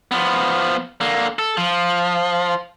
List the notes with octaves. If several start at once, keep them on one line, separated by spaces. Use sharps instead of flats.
F3 B3
D3 A#3
A4
F3